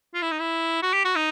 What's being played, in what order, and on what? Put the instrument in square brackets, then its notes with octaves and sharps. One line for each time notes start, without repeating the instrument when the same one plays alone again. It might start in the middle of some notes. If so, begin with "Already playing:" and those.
[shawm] F4
E4
D#4
E4
F#4
G4
F#4
D#4